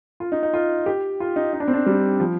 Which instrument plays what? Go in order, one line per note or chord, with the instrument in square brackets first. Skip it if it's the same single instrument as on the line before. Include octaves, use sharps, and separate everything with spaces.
[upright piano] F4
D#4
D#4
F4
G4
F4
D#4
D#4
D4
C4
D4
G3
F3